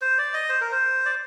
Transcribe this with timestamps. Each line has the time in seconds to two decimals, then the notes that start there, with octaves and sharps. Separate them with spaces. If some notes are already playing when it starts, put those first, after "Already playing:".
0.01 C5
0.18 D5
0.34 D#5
0.49 C5
0.61 A#4
0.72 C5
1.06 D5